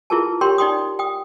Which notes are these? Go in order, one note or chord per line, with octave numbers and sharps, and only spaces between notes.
E4 F4 G#4 A#4 B4 A5
G4 A#4 C#5 G5 B5 C6
D#4 D5 G5 C6 D#6
G5 D#6